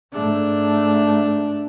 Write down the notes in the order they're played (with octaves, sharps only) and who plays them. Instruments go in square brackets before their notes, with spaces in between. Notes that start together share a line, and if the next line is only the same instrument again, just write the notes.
[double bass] G#2 A3 [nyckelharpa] D4